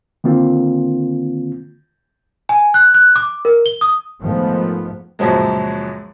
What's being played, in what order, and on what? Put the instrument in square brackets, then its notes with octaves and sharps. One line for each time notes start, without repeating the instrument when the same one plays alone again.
[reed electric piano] D3 D#3 A#3 C4 F4
[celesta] G#5
F#6
F#6
D6
A#4
G7
D#6
[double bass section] G#2 D#3 F3 A3 B3
[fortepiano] C#2 F#2 A#2 F3 F#3 G#3